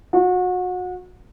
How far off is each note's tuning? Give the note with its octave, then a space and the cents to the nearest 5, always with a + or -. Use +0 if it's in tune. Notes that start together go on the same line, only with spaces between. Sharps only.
F#4 -30